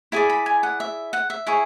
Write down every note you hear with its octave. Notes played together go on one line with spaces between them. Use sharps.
E4 G#4 D5 G#5
B5
G#5
F#5
E5
F#5
E5
E4 G#4 C#5